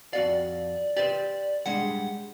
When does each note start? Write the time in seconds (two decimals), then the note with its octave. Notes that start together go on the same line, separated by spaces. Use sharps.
0.13 F2 F#4 D5 F5
0.97 G4 B4 C5 D5
1.66 G3 G#3 D4 F#5